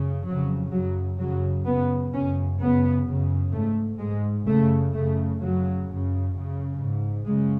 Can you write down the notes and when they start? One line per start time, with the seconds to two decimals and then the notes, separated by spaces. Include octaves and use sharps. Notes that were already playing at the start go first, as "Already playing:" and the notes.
Already playing: F#2 C#3
0.26 F2 C#3 F#3
0.72 F#2 C#3 F#3
1.19 F#2 C#3 F#3
1.66 F#2 C#3 B3
2.13 F#2 C#3 C#4
2.59 F#2 C#3 B3
3.06 F#2 C#3
3.52 G#2 A3
4.00 G#2 G#3
4.46 F#2 C#3 A3
4.93 F#2 C#3 A3
5.40 F#2 C#3 F#3
5.87 F#2 C#3
6.33 F#2 C#3
6.79 G#2
7.26 F#2 C#3 G#3